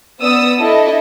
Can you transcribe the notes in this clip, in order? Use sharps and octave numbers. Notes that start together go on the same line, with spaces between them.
B3 D5 D#6 E6
D4 E4 A4 D#5